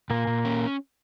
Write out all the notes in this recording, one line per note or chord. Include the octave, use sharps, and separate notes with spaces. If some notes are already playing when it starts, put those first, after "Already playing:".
A#2 A#3
A#2
C#4